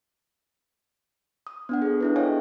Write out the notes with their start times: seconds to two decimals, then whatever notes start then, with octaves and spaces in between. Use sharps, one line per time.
1.47 D#6
1.69 B3 D4 F#5
1.82 G#4 A4
2.01 D4 E4 B4
2.16 G4 A4 C#5 D#5 F5 G#5